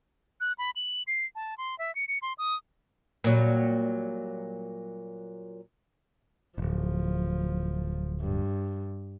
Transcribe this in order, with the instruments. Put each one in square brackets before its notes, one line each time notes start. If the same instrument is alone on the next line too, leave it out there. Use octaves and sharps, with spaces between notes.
[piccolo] F#6
B5
F#7
C7
A5
C6
E5
C#7
C#7
C6
D#6
[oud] A#2 F#3 G3
[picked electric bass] D1 G#1 [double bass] F3
[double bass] G2